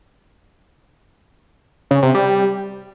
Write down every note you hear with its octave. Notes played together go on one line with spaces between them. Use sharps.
C#3
C3
G3